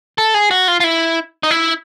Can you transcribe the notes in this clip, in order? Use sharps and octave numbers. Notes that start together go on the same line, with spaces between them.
A4
G#4
F#4
F4
F4
E4
D#4
E4